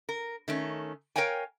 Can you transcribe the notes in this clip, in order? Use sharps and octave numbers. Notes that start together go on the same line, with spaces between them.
A#4
D#3 A3 C#4
A#4 C#5 F5 G5 G#5